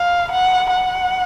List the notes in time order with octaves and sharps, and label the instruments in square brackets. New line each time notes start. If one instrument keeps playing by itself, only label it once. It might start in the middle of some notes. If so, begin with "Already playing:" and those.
Already playing: [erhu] F5
F#5
F#5